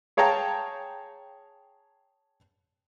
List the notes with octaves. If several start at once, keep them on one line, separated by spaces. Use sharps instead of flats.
G#4 C#5 F5 G5 A5 A#5